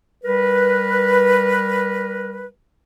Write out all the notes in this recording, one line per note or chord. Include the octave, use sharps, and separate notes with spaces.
G3 A#4 B4